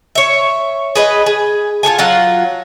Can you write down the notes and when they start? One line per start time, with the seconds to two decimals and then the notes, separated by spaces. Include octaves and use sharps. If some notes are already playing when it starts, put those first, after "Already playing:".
0.15 C#5 E5
0.95 G#4 B4 D#5
1.26 G#4
1.83 F4 G#4 A4 G#5
1.98 F#3 F4 F#5